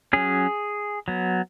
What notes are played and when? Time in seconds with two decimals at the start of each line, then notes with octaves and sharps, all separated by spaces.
0.13 F#3 C#4 G#4
1.08 F#3 B3